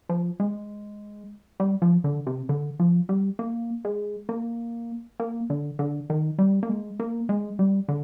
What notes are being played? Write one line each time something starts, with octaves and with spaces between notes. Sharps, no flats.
F3
G#3
G3
F3
D3
C3
D3
F3
G3
A#3
G#3
A#3
A#3
D3
D3
D#3
G3
A#3
G#3
A#3
G#3
G3
D3